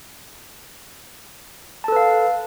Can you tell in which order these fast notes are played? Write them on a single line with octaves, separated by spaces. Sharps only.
A5 A4 B4 F5